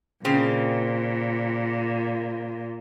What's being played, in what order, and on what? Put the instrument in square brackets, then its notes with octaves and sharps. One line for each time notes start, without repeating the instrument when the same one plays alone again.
[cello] A#2 [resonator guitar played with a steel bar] C#3 C4